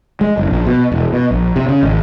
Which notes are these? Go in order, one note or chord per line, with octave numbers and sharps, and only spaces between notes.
G#3
F#1
A#1
B2
E1
B2
A#1
C3
C#3
G#1